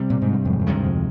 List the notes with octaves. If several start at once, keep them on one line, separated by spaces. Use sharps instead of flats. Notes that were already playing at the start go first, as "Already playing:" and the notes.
Already playing: C3 G3 C4
A#2
G#2
G2
F2 G#2
F2
D2 G2 C3 D#3 G#3
F2